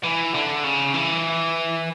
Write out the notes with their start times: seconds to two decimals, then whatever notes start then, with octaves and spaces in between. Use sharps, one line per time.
0.04 E3
0.34 D3
0.64 C#3
0.94 E3